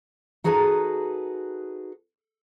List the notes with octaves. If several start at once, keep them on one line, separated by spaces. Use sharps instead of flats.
D#4 F#4 G#4 A4 B4 A#5